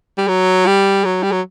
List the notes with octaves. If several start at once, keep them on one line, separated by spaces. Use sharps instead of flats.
G3
F#3
G3
F#3
G3
F#3